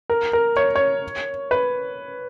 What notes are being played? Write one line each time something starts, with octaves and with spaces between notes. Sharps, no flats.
A#4
A#4
C#5
C#5
B4